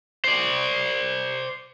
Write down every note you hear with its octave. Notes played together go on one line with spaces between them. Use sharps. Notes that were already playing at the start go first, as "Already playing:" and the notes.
C5 D5